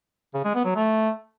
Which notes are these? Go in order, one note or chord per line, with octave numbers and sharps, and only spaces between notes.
C#3
G#3
B3
F#3
A3